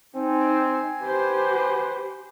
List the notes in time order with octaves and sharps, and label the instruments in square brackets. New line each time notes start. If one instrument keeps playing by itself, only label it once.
[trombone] C4 [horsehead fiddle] D#4 [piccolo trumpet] G#5
[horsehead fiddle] G4 C5 [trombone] B4